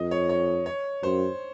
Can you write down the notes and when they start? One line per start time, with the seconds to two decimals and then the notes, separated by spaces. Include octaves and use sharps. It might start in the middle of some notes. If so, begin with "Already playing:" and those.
Already playing: F2 D#5
0.11 C#5
0.29 C#5
0.66 C#5
1.03 F#2 C5